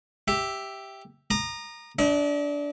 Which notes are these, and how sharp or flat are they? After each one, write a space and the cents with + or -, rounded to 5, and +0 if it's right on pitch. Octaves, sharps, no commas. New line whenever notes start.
G4 +0 E5 +0
A#5 +0 D#6 -35
D4 -20 D#5 +45